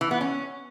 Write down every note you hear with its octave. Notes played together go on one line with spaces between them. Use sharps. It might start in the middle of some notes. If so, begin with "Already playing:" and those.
E3
B3
C#4